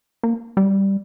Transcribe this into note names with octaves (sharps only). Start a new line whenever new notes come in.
A#3
G3